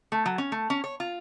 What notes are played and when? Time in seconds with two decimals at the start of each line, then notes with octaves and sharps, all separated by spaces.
0.12 A3
0.26 F#3
0.38 C#4
0.52 A3
0.70 C#4
0.84 C#5
1.00 F4